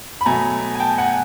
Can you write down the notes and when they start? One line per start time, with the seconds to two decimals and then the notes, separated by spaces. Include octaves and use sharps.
0.21 B5
0.26 B2 F#3 A3 G#5 A#5
0.75 G#5
0.80 G5 A5
0.98 F#5 G#5